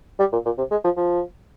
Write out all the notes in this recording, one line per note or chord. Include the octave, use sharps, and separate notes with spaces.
G3
A#2
A#2
C3
G#3
F3
F3